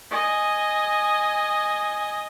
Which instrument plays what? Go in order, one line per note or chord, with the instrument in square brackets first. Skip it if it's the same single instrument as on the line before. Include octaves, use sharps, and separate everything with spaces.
[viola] D#5 G#5